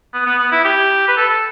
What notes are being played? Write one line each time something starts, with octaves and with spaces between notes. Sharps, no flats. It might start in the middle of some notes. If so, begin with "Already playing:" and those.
B3
B3
B3
E4
G4
B4
A4
A4